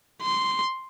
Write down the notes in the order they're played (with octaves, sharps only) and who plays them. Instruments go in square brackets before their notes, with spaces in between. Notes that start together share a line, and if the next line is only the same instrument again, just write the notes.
[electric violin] C6